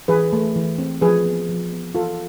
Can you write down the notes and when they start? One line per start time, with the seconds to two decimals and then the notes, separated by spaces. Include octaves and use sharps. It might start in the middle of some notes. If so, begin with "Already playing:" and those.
0.08 E3 G#4 B4
0.33 A3
0.56 E3
0.78 C4
1.01 F3 G#4 B4
1.26 B3
1.49 F3
1.72 B3
1.95 E3 F4 A4